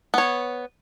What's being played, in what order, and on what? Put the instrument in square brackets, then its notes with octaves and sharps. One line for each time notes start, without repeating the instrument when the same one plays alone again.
[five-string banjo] B3 C#5